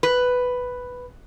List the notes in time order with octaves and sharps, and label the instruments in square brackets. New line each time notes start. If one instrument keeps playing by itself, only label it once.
[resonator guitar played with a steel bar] B4